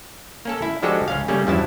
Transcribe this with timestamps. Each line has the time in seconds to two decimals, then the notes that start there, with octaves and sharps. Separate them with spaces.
0.45 A#3 C#4 A4
0.62 E4
0.82 F3 G#3 D4 F#4 G4 A4
1.08 C#2 C#4 F5
1.28 C#3 G3 A3 A#3 C#4
1.47 E2 G2 F3 F#3 E4 A5